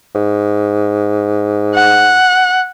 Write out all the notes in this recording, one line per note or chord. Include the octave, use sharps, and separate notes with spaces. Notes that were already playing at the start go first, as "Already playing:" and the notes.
G#2
F#5